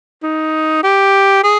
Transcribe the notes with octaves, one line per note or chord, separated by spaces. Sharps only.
D#4
G4
G#4